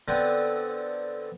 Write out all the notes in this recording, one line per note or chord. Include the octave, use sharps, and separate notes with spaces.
D3 B3 C4